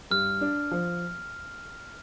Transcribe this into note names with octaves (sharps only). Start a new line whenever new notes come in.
G2 F6
D4
F3